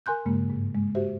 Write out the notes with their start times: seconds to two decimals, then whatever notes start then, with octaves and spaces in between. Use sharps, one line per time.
0.06 A#4 G#5 C6 F#6 G6
0.26 G2 C#3 G#3 A#3
0.50 G#2
0.75 G#3
0.95 F#4 G4 C5 E5